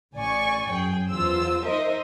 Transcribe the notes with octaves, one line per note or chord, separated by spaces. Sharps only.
A1 D5 G#5 C#6
F#2 G#4 G5
E2 F4 C5 E6
D#4 A#4 C5 D#5 E5